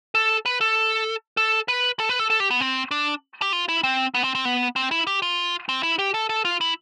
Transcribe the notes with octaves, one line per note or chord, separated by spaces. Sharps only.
A4
B4
A4
A4
B4
A4
B4
A4
A4
G4
B3
C4
D4
G4
F4
E4
C4
B3
C4
C4
B3
C4
E4
G4
F4
C4
E4
G4
A4
A4
F4
E4